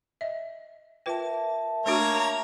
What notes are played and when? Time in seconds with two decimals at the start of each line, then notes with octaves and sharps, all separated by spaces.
0.21 D#5 E5
1.06 F4 A#4 B4 E5 G5 A5
1.86 A3 A#3 D4 F#4 C#5 A#5